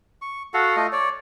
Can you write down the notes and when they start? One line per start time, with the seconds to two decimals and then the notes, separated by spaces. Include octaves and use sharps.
0.22 C#6
0.54 F#4 A4 F5 F#5
0.76 A3 F4 D#5
0.93 C#5 D5